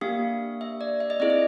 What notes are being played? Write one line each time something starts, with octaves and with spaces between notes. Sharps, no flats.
A#3 D4 G4 F5
E5
D5
E5
D#5
C4 E4 G#4 D5
D#5